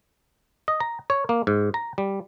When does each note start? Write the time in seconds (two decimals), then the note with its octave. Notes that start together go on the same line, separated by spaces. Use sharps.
0.68 D#5
0.80 A#5
1.10 C#5
1.29 A#3
1.47 G#2
1.74 A#5
1.98 G3